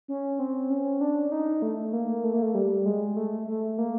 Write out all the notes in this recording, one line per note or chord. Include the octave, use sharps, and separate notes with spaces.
C#4
C4
C#4
D4
D#4
A3
A#3
A3
A#3
A3
G3
G#3
A3
A3
A#3